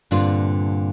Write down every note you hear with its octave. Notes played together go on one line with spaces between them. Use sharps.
G2 A#2 D3 C4 D4 F4